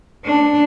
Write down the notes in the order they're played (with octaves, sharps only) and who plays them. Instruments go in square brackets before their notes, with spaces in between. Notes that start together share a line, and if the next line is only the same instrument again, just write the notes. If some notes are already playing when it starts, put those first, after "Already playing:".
[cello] D4